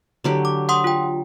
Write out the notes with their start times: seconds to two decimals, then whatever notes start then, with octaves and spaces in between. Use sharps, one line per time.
0.24 D3 F#3 G4
0.45 D6
0.69 F#5 C6 D#6
0.84 F4 G5